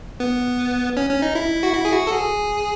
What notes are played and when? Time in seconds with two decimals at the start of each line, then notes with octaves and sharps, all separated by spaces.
0.20 B3
0.97 C#4
1.10 C#4
1.22 D#4
1.35 E4
1.63 F#4
1.74 E4
1.85 G#4
1.92 F#4
2.07 A4
2.12 G#4